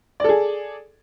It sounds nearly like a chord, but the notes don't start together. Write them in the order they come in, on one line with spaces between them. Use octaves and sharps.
D5 A4 G#4